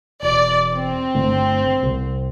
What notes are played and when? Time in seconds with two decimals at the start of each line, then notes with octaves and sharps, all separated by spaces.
0.22 E1 D5
0.74 C4
1.14 G1 D3 A3
1.83 C2